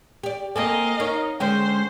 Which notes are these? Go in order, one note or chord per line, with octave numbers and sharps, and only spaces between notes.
G4 D5
A#3 C4 A4 D#5 F5 G#5
D#4 A#4 C#5
D3 G#3 C#4 C5 G5